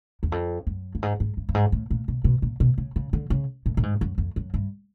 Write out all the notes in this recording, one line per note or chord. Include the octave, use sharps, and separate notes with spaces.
E2
F2
F#2
G2
G#2
G#2
G2
G2
G#2
A2
A#2
B2
B2
A#2
B2
C#3
C#3
D3
C#3
A2
A2
G#2
F#2
F2
F#2
G2